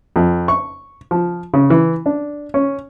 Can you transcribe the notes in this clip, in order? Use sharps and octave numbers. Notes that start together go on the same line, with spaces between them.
F2
C#6
F3
C#3
E3
D4
C#4